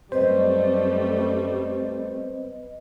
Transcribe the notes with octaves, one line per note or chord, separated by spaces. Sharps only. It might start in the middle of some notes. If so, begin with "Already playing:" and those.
F#2 G3 A3 C4 B4 C5 D#5